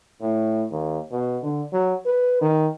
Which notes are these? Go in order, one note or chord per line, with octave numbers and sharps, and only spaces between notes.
A2
D#2
B2
D3
F#3
B4
D#3